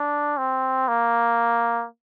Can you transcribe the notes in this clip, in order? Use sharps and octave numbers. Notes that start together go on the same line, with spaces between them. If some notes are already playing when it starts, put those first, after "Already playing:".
Already playing: D4
C4
A#3